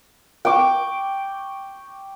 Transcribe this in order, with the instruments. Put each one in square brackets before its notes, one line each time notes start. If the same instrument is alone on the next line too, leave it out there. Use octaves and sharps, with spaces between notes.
[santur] G5 C#6 D6